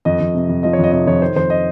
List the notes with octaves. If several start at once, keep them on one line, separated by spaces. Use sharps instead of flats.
F2 D#5
F2
C3
F2
F3 D#5
C#5
F2 D#5
C3 D#5
F2 C#5
D#3 C5
F2 C5
D#5